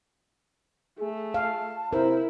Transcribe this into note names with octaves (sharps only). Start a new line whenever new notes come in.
A3 G#4
F5 A5
C3 E4 A#4 C5